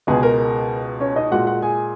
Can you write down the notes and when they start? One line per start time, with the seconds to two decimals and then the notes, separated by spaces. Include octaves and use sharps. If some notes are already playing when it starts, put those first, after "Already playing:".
0.07 C#2 B2 G#3 G#4
0.23 A#4
1.00 C#4 C#5
1.16 D#4 D#5
1.31 A#2 G#3 F#4 F#5
1.47 F#4 F#5
1.62 G#4 G#5